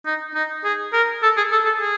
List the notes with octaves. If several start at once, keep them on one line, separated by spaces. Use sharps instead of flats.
D#4
D#4
G#4
A#4
A4
G#4
A4
A4
G#4